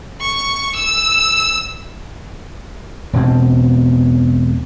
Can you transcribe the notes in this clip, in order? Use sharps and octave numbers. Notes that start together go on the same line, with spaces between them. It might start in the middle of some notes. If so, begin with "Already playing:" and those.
C#6
E6
E1 B2 C4